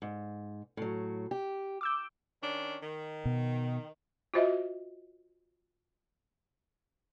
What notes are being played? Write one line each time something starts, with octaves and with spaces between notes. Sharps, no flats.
G#2
A2 F#3
G4
D6 E6 G6
D#3 C#4 D4
D#3
B2
F4 F#4 C5 D#5 E5